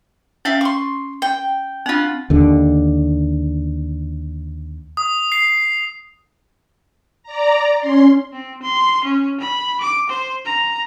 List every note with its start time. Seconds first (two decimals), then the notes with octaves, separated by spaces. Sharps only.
0.45 C#4 E5 F5 G5
0.61 C6 C#6
1.22 G5
1.86 C4 D4 F4 F#5
2.30 D#2 D3
4.97 D#6
5.32 C7
7.23 D5 A#5
7.79 C#4 C6
8.33 C4
8.63 C6
9.05 C#4
9.41 B5
9.81 D6
10.10 C5
10.46 A#5